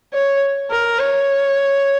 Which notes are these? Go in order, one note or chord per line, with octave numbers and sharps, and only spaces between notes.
C#5
A#4
C#5